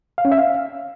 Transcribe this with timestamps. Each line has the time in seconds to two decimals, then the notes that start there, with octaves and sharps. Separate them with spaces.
0.18 F5
0.25 C#4
0.32 E5
0.38 F5